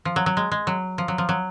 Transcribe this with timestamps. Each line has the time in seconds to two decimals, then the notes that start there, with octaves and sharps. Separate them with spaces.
0.05 F3
0.16 F#3
0.26 F#3
0.37 G#3
0.52 G#3
0.67 F#3
0.98 F3
1.08 F#3
1.18 F3
1.29 F#3